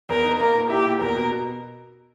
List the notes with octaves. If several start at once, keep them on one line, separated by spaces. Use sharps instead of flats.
E2 A#4
D#4
A#3 A#4
A#2
E4 G4
A#2
E2 A#4
B2
B2